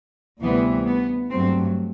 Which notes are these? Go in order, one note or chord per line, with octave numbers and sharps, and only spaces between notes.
D2 C3 E3 G3 B3
B3
G2 F#3 A3 C4